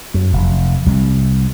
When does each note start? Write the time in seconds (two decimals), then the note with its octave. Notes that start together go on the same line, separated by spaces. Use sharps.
0.14 F#2
0.33 F1
0.86 C2